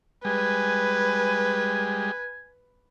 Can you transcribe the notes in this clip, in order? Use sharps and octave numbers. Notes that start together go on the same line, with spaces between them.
G3 G#3 B4 G#5